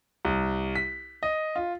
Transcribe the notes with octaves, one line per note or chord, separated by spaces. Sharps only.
C2
B6
D#5
F4